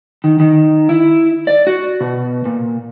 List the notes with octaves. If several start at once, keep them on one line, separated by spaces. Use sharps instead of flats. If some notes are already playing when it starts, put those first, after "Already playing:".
D#3
D#3
E4
D5
F#4
B2
A#2